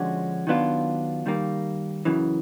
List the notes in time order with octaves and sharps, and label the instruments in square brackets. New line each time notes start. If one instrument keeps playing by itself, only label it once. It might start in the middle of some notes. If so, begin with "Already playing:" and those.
Already playing: [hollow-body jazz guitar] D3 F3 G#3 C#4 F#4
D#3 F#3 B3 D4 F4
D#3 G3 A#3
F#2 C#3 E3